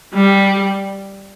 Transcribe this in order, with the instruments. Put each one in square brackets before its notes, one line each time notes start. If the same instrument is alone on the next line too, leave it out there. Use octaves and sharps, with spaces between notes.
[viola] G3